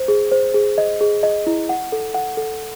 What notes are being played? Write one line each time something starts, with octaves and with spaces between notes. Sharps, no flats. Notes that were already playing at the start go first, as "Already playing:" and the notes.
Already playing: C5
G#4
C5
G#4
D#5
G#4
D#5
E4
F#5
A4
F#5
A4